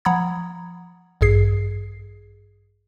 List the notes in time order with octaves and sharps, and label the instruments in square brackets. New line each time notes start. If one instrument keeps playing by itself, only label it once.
[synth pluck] F3 F#5 A#5 B5 D#6 G#6
A1 G2 G#4 C7